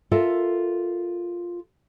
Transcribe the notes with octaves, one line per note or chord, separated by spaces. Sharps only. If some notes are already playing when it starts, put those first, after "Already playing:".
F4 A4 A#4 E5